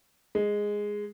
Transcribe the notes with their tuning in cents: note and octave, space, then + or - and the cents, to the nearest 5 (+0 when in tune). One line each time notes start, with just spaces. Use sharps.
G#3 -5